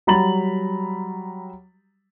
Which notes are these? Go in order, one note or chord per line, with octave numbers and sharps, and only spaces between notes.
F#3 G3 A#5 B5 A6 F#7